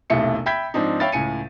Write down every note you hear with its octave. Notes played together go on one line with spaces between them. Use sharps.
E1 B1 C3 A3 E4 C#7
E5 G5 B5 G6 G#6 B6
G#2 F3 C4 D4 D#4
C#5 E5 F5 G5 B5 A6
C#2 A2 G#5 C#7 D#7